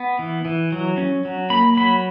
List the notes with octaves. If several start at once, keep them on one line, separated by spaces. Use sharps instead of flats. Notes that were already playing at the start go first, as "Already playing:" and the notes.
Already playing: B3
E3
E3
F#3
C#4
F#3
A#3 B5
F#3 B5